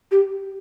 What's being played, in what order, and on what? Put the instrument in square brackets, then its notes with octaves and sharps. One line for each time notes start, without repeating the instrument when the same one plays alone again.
[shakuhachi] G4